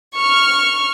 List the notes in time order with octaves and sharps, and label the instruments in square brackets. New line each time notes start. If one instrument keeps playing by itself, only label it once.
[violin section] C#6 F6